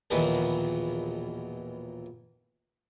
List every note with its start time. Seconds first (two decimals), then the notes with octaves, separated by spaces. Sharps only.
0.11 A#1 D#2 B2 E3